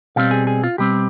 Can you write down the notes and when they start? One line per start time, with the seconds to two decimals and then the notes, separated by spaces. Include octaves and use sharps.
0.16 B2 G3 C4 F5
0.31 G#4
0.47 G#4
0.64 F4
0.78 B2 G3 C4 G4